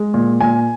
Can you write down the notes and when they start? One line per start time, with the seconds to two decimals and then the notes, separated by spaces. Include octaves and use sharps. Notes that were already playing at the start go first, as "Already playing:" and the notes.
Already playing: G#3
0.14 A#2
0.40 A#2 G#5